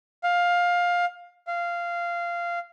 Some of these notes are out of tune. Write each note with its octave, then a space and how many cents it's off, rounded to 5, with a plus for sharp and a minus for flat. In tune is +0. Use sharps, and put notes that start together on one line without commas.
F5 +15
F5 -15